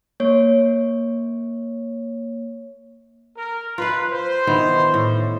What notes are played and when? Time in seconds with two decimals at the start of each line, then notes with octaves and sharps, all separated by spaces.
0.20 A#3 C#5
3.36 A#4
3.78 F4 B4 F5
4.11 C5
4.47 D#3 E3 B3
4.94 A2